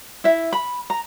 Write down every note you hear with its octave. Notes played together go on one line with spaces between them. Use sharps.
E4 E5
B5
A#5